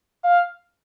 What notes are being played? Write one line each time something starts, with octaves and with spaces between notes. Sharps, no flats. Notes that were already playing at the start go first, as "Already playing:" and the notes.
F5